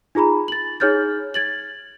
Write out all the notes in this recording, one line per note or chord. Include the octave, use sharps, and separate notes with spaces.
D#4 F4 G#4 A#5 B5
A6 F#7
D#4 G#4 C#5 F6 G6 A6
G#6 A6 F#7